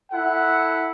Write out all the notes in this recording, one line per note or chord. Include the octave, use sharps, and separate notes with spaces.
E4 A4 F#5